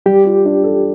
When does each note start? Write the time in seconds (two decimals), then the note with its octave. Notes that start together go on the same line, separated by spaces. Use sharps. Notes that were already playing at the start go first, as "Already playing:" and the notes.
0.06 G3 G4
0.25 F4
0.45 D4
0.64 A4